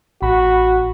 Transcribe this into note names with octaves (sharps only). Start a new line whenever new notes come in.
A1 F#4 B5